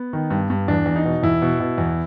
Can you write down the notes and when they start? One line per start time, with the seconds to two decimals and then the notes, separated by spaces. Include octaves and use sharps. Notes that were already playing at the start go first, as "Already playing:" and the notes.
Already playing: B3
0.13 D#3
0.30 G2
0.50 G2
0.68 E2 D4
0.86 E2
0.96 D#4
1.05 B2
1.23 E2 E4
1.42 B2
1.60 B2
1.78 E2